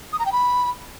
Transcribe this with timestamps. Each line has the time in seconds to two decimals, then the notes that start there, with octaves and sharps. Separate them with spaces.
0.13 D#6
0.19 A#5
0.26 G5
0.32 B5